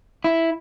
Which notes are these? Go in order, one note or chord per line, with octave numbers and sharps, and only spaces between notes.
E4